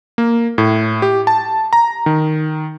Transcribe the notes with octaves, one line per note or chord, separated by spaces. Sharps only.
A#3
A2
G4
A5
A#5
D#3